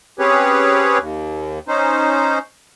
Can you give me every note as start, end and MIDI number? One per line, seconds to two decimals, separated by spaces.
0.19 0.98 60
0.19 0.98 61
0.19 0.98 67
0.19 0.98 68
0.19 0.98 71
0.19 0.98 73
0.99 1.59 39
1.68 2.38 61
1.68 2.38 63
1.68 2.38 72